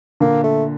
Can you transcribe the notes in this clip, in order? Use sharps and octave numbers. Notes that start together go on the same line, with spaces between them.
A#2 D3 A#3
A3